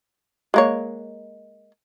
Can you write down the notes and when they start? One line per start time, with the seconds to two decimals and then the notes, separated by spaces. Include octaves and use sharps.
0.54 G#3 A#3 C#5